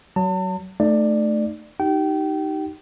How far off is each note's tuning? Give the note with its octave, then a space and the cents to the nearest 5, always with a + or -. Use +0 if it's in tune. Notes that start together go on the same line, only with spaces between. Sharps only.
F#3 +25 A5 +40
A3 +0 D#4 -35 D5 +20
D#4 +0 G4 -30 G5 -25